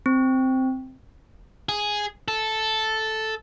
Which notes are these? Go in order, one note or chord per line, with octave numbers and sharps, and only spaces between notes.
C4
G#4
A4